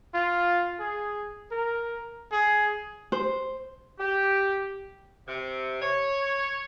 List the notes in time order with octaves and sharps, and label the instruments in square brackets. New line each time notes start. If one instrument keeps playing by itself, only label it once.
[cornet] F4
G#4
A#4
G#4
[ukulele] C5
[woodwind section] G4
[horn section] C3
C#5